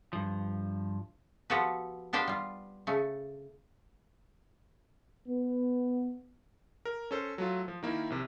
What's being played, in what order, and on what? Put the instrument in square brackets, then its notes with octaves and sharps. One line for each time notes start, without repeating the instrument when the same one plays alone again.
[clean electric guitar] G2 F3
[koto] F3 B3 F#4 G4 A4 B4
B3 D4 G4 C5 F5 G5
G3 F4
C#3 A3
[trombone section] B3
[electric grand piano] A#4
C#4 A4 C5
F#3 A3 F4
F3
D#3 A#3 E4
A#1 C3